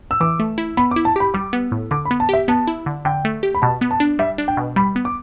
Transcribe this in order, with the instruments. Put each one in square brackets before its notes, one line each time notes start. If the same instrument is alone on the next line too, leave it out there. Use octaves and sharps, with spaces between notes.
[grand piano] E6
[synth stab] E3 [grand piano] D6
[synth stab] A3
E4
[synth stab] B3 [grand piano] B5
[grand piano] D6
[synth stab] E4
[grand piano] A5
[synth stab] G4 [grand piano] B5
[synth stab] G3 [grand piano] D6
[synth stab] B3
A2
[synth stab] D3 [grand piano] D6
[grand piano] B5
[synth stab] B3
[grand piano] A5
[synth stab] G4 [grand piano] E5
[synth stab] B3 [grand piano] A5
[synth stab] E4
D3
[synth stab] D3 [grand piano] G5
[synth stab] A3
G4
[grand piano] B5
[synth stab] B2 [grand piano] A5
[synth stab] B3
[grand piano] A5
[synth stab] D4
[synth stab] G3 [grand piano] E5
[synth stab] D4
[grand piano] G5
[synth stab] B2
[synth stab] G3 [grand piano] B5
[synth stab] B3
[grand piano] D6